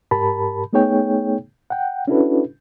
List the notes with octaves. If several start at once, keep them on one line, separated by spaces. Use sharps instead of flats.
G#2 G4 A#4 A5 B5
A3 B3 D#4 G#4 C#5 G5
F#5 G5
C#4 D4 E4 F#4 A4 B4